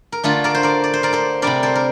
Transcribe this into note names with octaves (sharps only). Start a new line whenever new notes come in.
A#4
D3 A3 D4 F4 A4
A#4 D5
C5
A#4 D5
D5
C5
A#4 D5
A4 C5
C3 G3 D4 A#4 D5
A4 C5
A#4